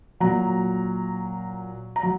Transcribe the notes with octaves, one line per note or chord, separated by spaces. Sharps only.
A#2 F#3 A#5
A#5
F#3